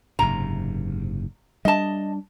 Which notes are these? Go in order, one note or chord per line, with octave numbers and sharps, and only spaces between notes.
F#1 G#2 C3 A#5
G3 D4 D#5 A5